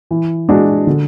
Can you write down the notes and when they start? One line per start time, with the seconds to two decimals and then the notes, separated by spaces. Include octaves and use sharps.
0.11 E3
0.49 G#3 D4 F#4
0.87 D3